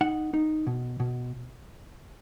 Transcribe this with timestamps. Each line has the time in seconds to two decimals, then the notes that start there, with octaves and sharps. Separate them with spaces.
0.01 D#4 F#5
0.34 D#4
0.67 B2
1.00 B2